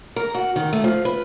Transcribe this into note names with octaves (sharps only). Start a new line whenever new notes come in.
A#4
F#4
D#3
A3
F3
B4